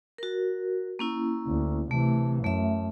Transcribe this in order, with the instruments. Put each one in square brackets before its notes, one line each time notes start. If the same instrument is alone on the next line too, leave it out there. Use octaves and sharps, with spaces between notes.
[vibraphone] F#4 A#4
A#3 C#4 E4
[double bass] D2
[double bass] C3 E3 [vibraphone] A3
[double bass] F#2 [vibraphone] A3 E5